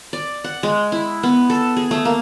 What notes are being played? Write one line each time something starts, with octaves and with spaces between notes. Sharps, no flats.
D5
F#5
G#3
E4
B3
A4
G#4
A3
A#3